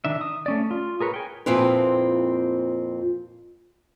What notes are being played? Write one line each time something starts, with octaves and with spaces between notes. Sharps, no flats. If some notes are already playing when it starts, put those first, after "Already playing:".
D#3 D4 E5
D#6
A3 C#4 D5
F4
G#4 A#4 B4 C#5
G5 G#5
F2 A#2 C4 E4 F4 B4